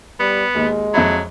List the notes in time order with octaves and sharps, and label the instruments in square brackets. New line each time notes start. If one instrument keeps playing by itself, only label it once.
[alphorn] G3 [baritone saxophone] B3
[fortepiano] D#2 [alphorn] G#3
[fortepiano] F2 E5 B5 [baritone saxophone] F#3